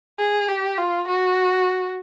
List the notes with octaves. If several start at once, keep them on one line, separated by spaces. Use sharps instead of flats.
G#4
G4
F4
F#4